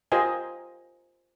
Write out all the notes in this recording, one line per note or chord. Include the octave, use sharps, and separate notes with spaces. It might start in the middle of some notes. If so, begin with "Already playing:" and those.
F4 G4 A#4 C5 D#5 G#5